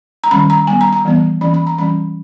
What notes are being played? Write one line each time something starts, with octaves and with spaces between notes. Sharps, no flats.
A#5
D#3 G3 C#4 B5
A#5
G3 B3 G#5
A#5
A#5
E3 G3 B3
E3 A#3 C#4 B5
B5
A#5
E3 G3 C#4 B5